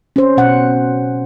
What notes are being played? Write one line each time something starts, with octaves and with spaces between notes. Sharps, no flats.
C#4 C5
B2 C#4 F#5